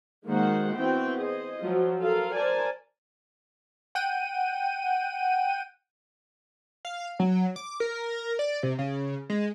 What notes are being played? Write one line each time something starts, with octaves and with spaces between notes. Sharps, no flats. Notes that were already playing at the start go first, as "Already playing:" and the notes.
D#3 G#3 A#3 F#4 C5 F#5
E3 B3 C4 F#4 G5
G#4 C5 D#5
F3 F#3 F4
F4 A4 A#4 F5
A#4 C5 D5 G#5 A5
F#5 G5 D#7
F5
F#3
D6
A#4
D5
C3
C#3
G#3